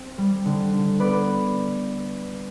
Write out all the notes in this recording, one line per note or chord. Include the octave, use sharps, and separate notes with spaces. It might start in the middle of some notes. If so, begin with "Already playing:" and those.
Already playing: C4
G3
D3
D3
B3 B4 D5